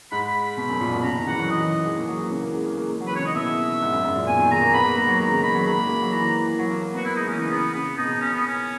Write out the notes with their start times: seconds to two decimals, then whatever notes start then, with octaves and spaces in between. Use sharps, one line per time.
0.11 G#2 B5
0.28 B5
0.57 B2
0.69 F#2
0.80 A#2
0.93 B2
1.00 B5
1.03 C#3 A#5
1.16 D#3
1.27 E3 F#5
1.39 F#3
1.50 E3 D#5
1.61 E3
1.84 G#3
1.97 A#3
2.08 F#3
2.19 E3
2.31 C#3
2.42 A#3
2.54 G#3
2.65 A#3
2.77 A#3
2.88 G#3
3.01 F#3
3.07 B4
3.12 E3
3.16 C#3 C#5
3.23 D#3 D#5
3.35 B2 E5
3.82 G#2
3.92 F#2
4.04 F#2
4.16 A#2
4.28 B2 G#5
4.39 D#3
4.51 G#3 A#5
4.62 A#3
4.74 B3 B5
4.85 A#3
4.97 G#3 A#5
5.08 F#3
5.20 D#3 A#5
5.32 C#3
5.43 D#3 B5
5.55 F#3
5.66 G#3 B5
5.78 A#3
5.89 A#3
6.02 F#3
6.12 E3 A#5
6.59 F#3
6.70 A#3
6.82 A#3
6.94 B3 F#4
7.05 A#3 E4
7.16 G#3 D#4
7.28 E3 C#4
7.39 C#3 D#4
7.51 C#3 B3
7.74 C#3 B3
7.97 B2 D#4
8.06 C#3
8.14 B2
8.21 C#4
8.34 B3
8.47 C#4